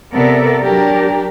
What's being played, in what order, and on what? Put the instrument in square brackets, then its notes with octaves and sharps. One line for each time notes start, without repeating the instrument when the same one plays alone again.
[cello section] C3 B3 A4 A#4 D5 E5
F#3 D4 G4 A#4